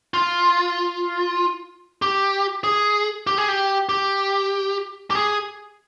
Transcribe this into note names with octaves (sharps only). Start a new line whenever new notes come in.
F4
G4
G#4
G4
G#4
G4
G4
G4
G#4